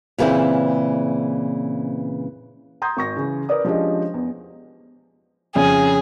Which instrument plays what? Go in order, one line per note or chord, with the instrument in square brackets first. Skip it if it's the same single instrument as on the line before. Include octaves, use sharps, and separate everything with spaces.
[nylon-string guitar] A#2 C#3 E3 C4 E4
[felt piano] A#5 C6 D#6 G6 G#6
G#1 C#6 A#6
C#3 E3
A#4 B4 D5 D#6
F3 G#3 C#4 D4 G4 D#5
E2
[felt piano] F2 C#3 [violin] G#4